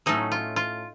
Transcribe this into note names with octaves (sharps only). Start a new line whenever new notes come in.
A2 F#3 A3 C#4 D#4
F4
F4